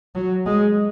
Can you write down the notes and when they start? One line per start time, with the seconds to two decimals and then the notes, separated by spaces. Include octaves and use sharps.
0.15 F#3
0.46 G#3